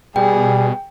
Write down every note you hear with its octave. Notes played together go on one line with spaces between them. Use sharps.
B2 G3 G#4 G5